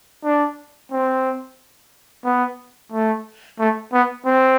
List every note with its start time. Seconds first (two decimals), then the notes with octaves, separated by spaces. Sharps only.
0.24 D4
0.92 C4
2.25 B3
2.92 A3
3.59 A3
3.93 B3
4.26 C4